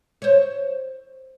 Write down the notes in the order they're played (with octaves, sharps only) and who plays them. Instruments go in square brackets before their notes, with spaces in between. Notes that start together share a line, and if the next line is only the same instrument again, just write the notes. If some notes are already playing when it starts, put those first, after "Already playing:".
[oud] C5 C#5